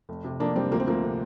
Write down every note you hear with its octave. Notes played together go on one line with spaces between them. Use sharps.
F1
C3
F2 A#3 D4
F1 G3 C4
D2 F3 A#3
C4
D2 F3 A#3
C3